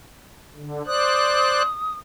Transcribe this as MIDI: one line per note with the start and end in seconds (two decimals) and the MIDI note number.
0.56 0.82 50
0.86 1.62 72
0.86 1.62 74
0.86 1.98 87
0.86 1.62 90